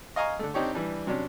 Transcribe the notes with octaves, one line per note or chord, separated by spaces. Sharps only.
D#5 F5 G#5 A#5 C#6
D3 A3
C4 D4 D#4 G4 C#5
E3 G3 D4
C3 F#3 C#4 D4